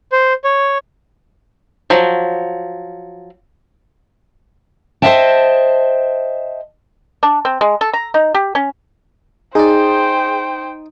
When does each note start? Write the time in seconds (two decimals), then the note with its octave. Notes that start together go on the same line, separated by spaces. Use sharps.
0.12 C5
0.44 C#5
1.90 F3 F#3
5.02 C5 C#5 D#5 E5 G5 A5
7.23 D4
7.45 C4
7.61 G#3
7.81 A4
7.93 A#5
8.14 D#4
8.34 G4
8.55 C#4
9.55 D#4 G#4 C5 D5 G5